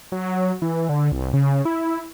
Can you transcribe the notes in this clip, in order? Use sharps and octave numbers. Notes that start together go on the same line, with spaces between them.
F#3
E3
D3
C2
C#3
E4